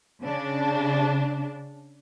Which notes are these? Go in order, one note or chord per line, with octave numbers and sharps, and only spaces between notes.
C#3 D4